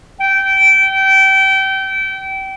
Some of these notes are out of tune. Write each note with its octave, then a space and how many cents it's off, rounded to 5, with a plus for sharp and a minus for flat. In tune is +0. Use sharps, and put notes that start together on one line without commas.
G5 -25